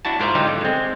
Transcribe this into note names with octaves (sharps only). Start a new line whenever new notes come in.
D4 E4 F#4 A5
G#2 F4 A#4 C5 D5 E5
D3 F#3 G3 D#4 F4 G4
D3
G#3 C4